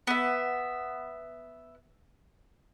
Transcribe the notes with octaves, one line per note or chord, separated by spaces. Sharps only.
B3 E5